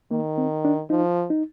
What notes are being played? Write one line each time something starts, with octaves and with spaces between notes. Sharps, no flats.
D#3 A#3
C4
D4
F3 D#4
D#4